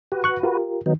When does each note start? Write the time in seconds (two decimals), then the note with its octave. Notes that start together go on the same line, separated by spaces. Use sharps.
0.12 F#4 G4 B4
0.24 C#6 F#6
0.43 F4 G4 A#4
0.86 D#3 F#3 B3 D#4